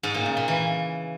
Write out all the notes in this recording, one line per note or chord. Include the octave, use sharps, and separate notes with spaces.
G#2
A#2
C#3
A#2
E3